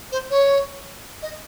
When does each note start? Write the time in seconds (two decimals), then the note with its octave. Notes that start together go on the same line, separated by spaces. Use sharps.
0.12 C5
0.30 C#5
1.22 D#5